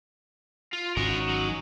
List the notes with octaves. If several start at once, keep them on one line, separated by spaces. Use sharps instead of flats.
F4
G#1 G#2 C#4 D#4 F#4 A#4 C#5
F#3